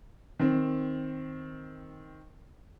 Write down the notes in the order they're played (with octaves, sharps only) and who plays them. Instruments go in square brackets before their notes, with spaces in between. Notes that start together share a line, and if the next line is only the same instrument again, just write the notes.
[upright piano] D#3 C4